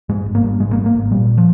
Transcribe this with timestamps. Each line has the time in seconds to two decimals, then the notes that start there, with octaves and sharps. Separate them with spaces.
0.09 G2 G#3
0.26 G#1
0.35 A#3
0.44 G2
0.60 G#1 G#3
0.73 A#3
0.78 G2
0.86 A#3
0.95 G#1
1.11 A#2 G3
1.38 F3